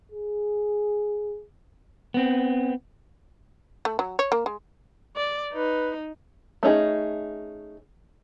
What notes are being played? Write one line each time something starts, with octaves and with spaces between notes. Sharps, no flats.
G#4
B3 C4
A3
F#3
C#5
A#3
G#3
D5
D#4 B4
A3 C#4 D#4 F#4 G#4